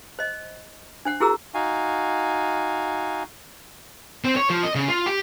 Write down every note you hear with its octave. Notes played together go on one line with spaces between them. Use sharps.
C5 D#5
D4 C5 F#5
E4 F#4 G#4 A#4 A#5 E6
D#4 F#4 F5 G#5
C4
C#5
F3
D#5
C#3
F4
G4